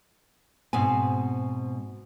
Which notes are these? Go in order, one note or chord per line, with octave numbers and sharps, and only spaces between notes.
G#2 B2 C4 G#5